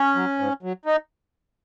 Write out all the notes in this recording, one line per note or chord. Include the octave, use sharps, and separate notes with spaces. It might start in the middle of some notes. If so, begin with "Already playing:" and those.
Already playing: C#4
F#3
G#2
F#3
D#4